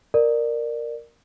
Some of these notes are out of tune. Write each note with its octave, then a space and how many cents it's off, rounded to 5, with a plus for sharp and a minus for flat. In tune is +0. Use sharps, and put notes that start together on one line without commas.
A#4 +0 D5 +20